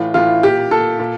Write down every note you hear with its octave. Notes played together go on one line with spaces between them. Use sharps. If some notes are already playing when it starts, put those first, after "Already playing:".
Already playing: A2 E3 F4
A2 E3 F4
A#2 G4
A#2 A4
A#2